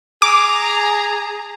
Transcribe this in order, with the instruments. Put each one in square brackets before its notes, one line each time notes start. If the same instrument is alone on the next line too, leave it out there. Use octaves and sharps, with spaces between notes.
[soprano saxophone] G#4 [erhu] A#5 [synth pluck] D6